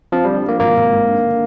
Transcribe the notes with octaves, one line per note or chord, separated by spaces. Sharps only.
F3 C4
D3 G3
F3 A#3
G#1 A#3
G#1
G#2
D4
D3